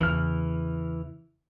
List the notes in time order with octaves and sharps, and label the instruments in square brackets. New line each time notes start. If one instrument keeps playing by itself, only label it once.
[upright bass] E2 C#3 [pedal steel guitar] E3 F6